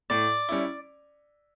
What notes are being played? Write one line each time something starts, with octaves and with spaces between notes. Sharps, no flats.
A2 D5
G3 C#4 E4